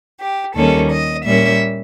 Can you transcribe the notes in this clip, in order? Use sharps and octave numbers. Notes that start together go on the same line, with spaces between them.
G4
D#2 D#3 G3 A#3 C#4 A4
D#5
A#2 G3 A#3 C#4 E5